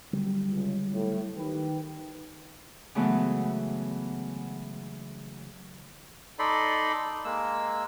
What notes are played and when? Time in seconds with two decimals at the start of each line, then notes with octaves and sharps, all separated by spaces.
0.13 D3 F#3 G3
0.50 C#2
0.93 A2
1.36 D#3 G4 B4
2.95 C#3 E3 F#3 G#3 A3 B3
6.39 D#4 A4 D5 B5 C6
7.25 G#3 A#3 E6